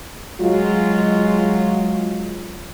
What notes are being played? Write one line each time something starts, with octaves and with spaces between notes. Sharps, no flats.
F#3 G#3 F4